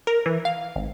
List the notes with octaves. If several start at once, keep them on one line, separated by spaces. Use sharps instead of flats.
A#4
E3
F5
G#1